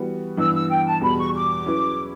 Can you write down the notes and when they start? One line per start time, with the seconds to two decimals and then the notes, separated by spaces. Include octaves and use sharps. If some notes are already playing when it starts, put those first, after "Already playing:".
Already playing: E3 G3 B3 F#4 B4
0.37 G2 E3 B3 E6
0.54 E6
0.70 G5
0.85 A5
1.01 E2 B2 G3 B5
1.17 C#6
1.33 D6
1.64 F#3 C#4 E4 B4